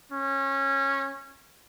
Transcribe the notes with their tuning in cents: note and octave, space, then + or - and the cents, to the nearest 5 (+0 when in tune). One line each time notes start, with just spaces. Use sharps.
C#4 -20